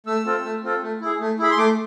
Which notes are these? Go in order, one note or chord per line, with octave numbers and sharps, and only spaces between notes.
A3 E6
C4 F4 A4
A3
C4 F4 A4
A3
E4 G#4
A3
E4 G#4 B5
C6
A3 D6